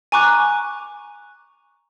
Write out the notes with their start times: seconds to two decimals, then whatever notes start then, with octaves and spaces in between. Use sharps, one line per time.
0.12 G#5 A#5 C#6 D6 F#6